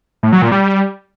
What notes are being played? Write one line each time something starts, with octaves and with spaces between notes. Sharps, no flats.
A2
F#3
A#2
G3